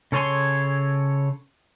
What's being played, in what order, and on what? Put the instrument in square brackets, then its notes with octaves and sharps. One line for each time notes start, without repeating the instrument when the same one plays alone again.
[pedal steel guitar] C#3 A4 C#5 G#5 C6